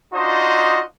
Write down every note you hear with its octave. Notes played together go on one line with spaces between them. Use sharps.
D4 D#4 F4 F#4 C5 D#5